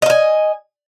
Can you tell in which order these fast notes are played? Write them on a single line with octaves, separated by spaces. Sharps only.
D#5 F5 G#5